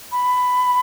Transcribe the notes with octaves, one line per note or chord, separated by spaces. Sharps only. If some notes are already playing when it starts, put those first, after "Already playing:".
B5